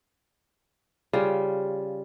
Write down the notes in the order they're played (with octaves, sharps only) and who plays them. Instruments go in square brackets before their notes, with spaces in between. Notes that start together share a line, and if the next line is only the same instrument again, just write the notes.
[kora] C#3 G3 F4